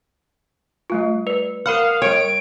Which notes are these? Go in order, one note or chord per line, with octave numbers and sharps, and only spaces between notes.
G3 A3 F4
B4 D5
A#4 F5 F#5 B5 F6
G3 C#5 G5 D7